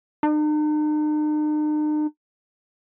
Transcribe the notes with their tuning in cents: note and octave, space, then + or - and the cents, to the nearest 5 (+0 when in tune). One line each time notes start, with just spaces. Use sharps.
D#4 -45